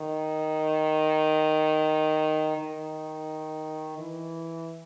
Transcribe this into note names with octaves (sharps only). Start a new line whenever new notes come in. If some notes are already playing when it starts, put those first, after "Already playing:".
Already playing: D#3
D#3
E3